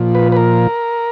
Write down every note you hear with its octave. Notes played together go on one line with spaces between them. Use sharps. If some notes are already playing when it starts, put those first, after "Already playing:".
Already playing: A#2 F3
B4
B4
A#4